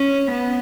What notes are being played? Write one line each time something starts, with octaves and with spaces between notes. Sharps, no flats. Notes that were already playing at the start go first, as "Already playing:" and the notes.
Already playing: C#4
B3